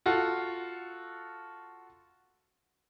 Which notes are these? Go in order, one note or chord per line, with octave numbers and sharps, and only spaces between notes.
F4 F#4 A4